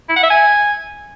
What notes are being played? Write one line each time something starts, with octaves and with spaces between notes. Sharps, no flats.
E4
F#5
E5
G#5